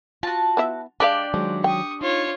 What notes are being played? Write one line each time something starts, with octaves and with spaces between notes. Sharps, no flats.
F4 F#4 A5
B3 E4 E5
G#3 D4 G4 B4 D5 F5 A5
D#3 F3 F#3 G#3
G5 C#6 D#6
D#4 F4 C#5